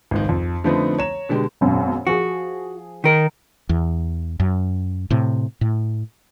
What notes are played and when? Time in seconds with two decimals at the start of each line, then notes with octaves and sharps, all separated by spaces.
0.11 G#1 C#2 D#3
0.29 F2
0.64 D3 F3 A3 B3 C4 D#4
0.98 C#5 A#5 E7
1.29 B2 D3 G#3 G4
1.61 G#1 F#2 B2
2.07 F3 F#4 G#4
3.04 D#3 A#4
3.69 E2
4.40 F#2
5.10 A2 C3
5.61 A2